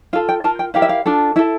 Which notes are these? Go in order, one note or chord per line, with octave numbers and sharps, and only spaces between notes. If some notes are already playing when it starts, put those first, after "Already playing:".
F4 A4 F5
G5
F4 A#4 A5
G5
E4 G4 A#4 F5
E5
F5
D4 F4 A4
E4 A4 E5